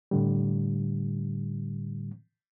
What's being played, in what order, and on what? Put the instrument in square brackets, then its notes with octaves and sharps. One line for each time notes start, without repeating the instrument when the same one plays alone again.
[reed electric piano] A2 D3 G3